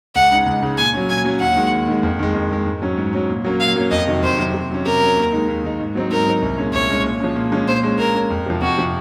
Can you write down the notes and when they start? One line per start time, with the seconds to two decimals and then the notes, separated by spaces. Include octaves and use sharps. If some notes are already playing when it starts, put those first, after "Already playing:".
0.15 C#2 F#5
0.31 C#3 G#3 D#4
0.46 C#2
0.62 C#3 G#3 D#4
0.77 A#2 G#5
0.93 F#3 C#4
1.09 A#2 G#5
1.25 F#3 C#4
1.40 D#2 F#5
1.56 D#3 G#3
1.72 D#2
1.88 D#3 G#3
2.03 F2
2.19 D#3 G#3
2.35 F2
2.51 D#3 G#3
2.66 G#2
2.82 F#3 C#4
2.97 G#2
3.13 F#3 C#4
3.29 A#2
3.44 F#3 A#3 C#4
3.60 A#2 F5
3.76 F#3 A#3 C#4
3.91 F2 D#5
4.07 C3 D#3 F#3
4.23 F2 C5
4.38 C3 D#3 F#3
4.54 C3
4.70 F#3 C#4
4.86 C3 A#4
5.01 F#3 C#4
5.17 D#2
5.33 D#3 G#3 D#4
5.48 D#2
5.64 D#3 G#3 D#4
5.80 G#2
5.95 F#3 C4 D#4
6.10 G#2 A#4
6.26 F#3 C4 D#4
6.42 C2
6.58 A#2 G#3 C#4
6.73 C2 C#5
6.89 A#2 G#3 C#4
7.04 A#2
7.20 F3 G#3 C#4
7.36 A#2
7.52 F3 G#3 C#4
7.68 A#2 C5
7.83 G#3 C#4
7.99 A#2 A#4
8.15 G#3 C#4
8.30 F2
8.46 C3 F3
8.62 F2 F#4
8.78 C3 F3